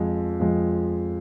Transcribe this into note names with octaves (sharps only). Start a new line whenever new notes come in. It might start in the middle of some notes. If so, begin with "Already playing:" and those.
Already playing: F2 F3 G#3
F2 F3 G#3